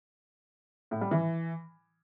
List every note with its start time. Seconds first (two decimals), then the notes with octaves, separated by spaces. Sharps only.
0.91 A2
1.01 G3
1.11 E3